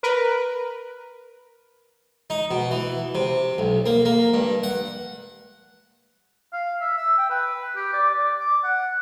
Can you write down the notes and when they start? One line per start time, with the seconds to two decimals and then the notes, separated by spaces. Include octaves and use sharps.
0.03 A#4 B4
2.30 D#4
2.51 B2
2.71 E3
3.15 C3
3.58 B1
3.86 A#3
4.05 A#3
4.34 G2
4.63 F#5
6.53 F5
6.81 E5
6.98 E6
7.18 G5
7.30 B4
7.76 G4
7.93 D5
8.14 D5
8.40 D6
8.64 F#5